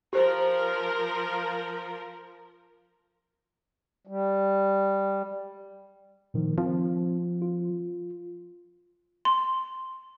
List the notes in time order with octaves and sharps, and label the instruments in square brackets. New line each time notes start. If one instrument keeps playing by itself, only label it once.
[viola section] F3 A#4 [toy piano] G4 C5
[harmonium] G3
[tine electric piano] A#2 D#3 F3
[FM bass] F3 [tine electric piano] C4
[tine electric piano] F4
[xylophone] C6